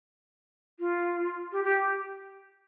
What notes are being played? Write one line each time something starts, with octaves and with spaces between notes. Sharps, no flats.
F4
G4
G4